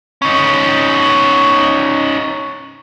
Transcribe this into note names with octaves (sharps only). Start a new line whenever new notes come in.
C#4 D#4